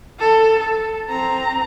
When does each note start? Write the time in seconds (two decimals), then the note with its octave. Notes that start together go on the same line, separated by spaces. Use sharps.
0.20 A4
0.59 A4
1.10 C4 A#5